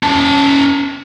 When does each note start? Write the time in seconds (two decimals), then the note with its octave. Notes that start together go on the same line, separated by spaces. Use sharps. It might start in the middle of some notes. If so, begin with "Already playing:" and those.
0.03 C#4 A5